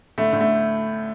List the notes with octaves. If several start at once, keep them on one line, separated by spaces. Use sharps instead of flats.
A2 D3 A3
A2 D3
A3